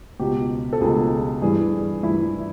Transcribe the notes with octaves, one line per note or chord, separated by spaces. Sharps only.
C#2 B2 G4
A4
C#2 B2 G#4
G2 E3 G#4
G2 E3 E4